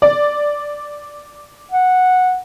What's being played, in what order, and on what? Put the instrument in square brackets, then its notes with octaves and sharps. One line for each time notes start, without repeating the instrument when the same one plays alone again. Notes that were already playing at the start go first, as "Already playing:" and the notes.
[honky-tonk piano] D5
[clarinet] F#5